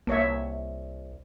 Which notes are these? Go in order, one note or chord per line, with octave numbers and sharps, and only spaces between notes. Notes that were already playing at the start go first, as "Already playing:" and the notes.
C2 A#3 C#5 E5